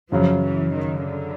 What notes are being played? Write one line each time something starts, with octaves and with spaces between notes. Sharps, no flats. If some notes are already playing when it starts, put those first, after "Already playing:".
F#2 C#3 F3 F#3
E3
D#3
D3